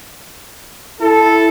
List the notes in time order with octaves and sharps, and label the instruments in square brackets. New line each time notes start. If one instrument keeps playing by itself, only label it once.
[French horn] E4 [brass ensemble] A4